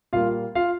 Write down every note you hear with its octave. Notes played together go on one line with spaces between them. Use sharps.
A#2 G3 A#3 F4 F5
F4 F5